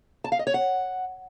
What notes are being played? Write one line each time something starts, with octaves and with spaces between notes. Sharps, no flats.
A5
F5
D#5
C#5
F#5